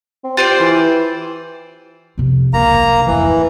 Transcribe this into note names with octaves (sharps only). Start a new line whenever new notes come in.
C4
F4 G4 C5 D5
E3
F2 C3
C#2 A#3 A#5
F#3
D1 F2 E3